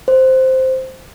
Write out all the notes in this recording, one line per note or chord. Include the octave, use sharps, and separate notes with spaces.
C5